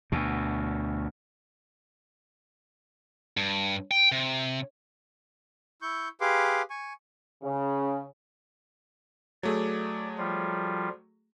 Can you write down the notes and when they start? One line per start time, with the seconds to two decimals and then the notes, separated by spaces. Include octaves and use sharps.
0.12 D2 B2
3.37 G2
3.91 G5
4.12 C3
5.82 E4 C#6 G6
6.21 G4 G#4 B4 F5 C6 D6
6.70 G#5 C#6
7.42 C#3
9.43 F#3 A3 G#4 D5
10.18 F3 G3 F4